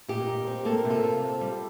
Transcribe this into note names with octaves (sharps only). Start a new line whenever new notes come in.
A#2 D#4 G4
A#2
C4
A#3 A4
A#4
C3
F4 A4
C3
C4
G3